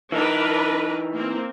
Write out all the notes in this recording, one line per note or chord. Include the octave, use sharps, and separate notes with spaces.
E3 D4 D#4 A#4 B4
A#3 C4